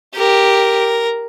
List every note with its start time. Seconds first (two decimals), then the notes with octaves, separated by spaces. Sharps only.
0.16 G4 A#4